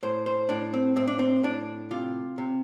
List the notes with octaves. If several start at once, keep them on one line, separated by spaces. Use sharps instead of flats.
A2 C5
C5
A2 D4
C4
A2 C4
D4
C4
A2 D4
C3 F4
C3